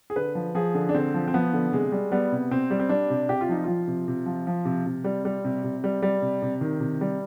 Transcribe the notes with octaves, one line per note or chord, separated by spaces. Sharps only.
G#4
D3 B4
F3
F3 G#4
D3
D4
D3 C4
F3
C4
F3 B3
D3
C3 G#3
G3
G3 B3
C3
C3 C4
G3
C4
G3 D4
C3
C3 G4
F4
F3 D#4
F3 F4
C3
C3
F3
F3
C3
C3
G3
G3
C3
C3
G3
G3
C3
C3
D#3
C3
G3